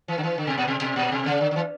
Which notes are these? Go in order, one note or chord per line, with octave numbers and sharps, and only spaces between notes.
E3
D3
E3
D3
B2
A#2
B2
B2
A#2
B2
C#3
D3
D3
E3